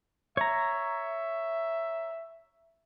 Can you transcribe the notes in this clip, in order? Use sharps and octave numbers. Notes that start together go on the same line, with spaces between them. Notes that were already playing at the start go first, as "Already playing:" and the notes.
C#5 E5 A#5